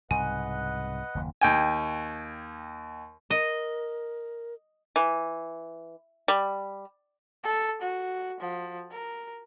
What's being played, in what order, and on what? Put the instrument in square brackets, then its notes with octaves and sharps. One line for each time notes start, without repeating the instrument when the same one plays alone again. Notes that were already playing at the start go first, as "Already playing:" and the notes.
[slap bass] C2 G#2 C#3 [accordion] B4 D#5 F#5 [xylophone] G#5
[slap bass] F#1 D#2
[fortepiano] D#2 G5 G#5
[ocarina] A#4 [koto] D#5
[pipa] E3
G3
[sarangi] A4
F#4
F3
A#4